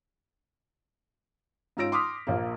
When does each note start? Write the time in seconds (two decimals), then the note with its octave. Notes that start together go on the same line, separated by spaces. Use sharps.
1.77 G#2 C#4 F4 E6 A#6 D7
1.92 C6 D6 D#6 F6 B6
2.27 A#1 A#3